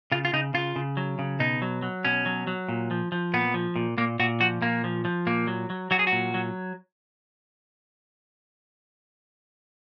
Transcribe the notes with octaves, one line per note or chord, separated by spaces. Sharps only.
C#3 F4
F4
C#3 D#4
C#3 F4
C#3
F#3
C#3
B2 D#4
F#3
F#3
B2 C#4
F#3
F#3
A#2
F3
F3
A#2 B3
F3
A#2
A#2 A#3
A#2 F#4
F3 F#4
A#2 A#3
F3
F3
A#2 A#3
F#3
F#3
F#3 F#4
G#4
F#4
A#2
F#3